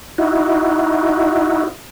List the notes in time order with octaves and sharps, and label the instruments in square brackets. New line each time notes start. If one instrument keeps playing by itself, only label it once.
[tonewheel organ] D#4 E4 F#4